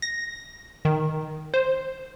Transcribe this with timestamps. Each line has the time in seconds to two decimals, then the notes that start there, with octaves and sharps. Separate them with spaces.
0.02 A#6
0.85 D#3
1.54 C5